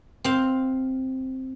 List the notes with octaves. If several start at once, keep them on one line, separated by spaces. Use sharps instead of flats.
C4 F5